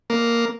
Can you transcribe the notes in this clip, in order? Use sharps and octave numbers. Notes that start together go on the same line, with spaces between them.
A#3